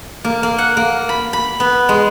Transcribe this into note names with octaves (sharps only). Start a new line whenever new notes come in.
A#3
A#3
F#5
A#3
B5
B5
B3
G#3